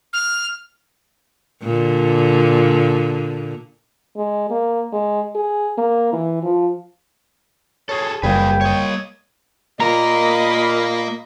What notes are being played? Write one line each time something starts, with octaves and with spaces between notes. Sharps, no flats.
F6
A#2 D3
G#3
A#3
G#3
G#4
A#3
E3
F3
G#4 A4 C#5
F#1 G3 A#3 G#4 B4 G5
C#5 D#5
A#2 A#3 A#4 D#5 A#5 B5